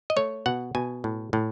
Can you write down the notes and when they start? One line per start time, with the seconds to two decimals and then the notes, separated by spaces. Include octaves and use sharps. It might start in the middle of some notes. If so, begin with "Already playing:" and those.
0.10 D#5
0.16 A3 C#5
0.46 B2 F#5
0.75 B2 G#5
1.04 A2
1.33 A2